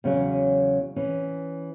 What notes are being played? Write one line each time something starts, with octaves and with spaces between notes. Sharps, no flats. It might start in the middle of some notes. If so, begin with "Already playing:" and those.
E2 C#3 F#3 C#4
E3 C#4